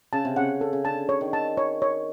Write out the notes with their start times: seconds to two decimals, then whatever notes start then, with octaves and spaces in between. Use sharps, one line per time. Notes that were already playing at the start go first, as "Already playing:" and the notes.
0.13 C#3 A5
0.25 C3
0.36 C#3 F#5
0.61 A4
0.73 C#3
0.85 D3 A5
1.09 C#5
1.21 D#3
1.33 A5
1.57 C#5
1.82 C#5